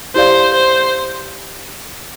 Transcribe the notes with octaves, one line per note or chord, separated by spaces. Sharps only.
E4 G4 C5 D5 F5
C5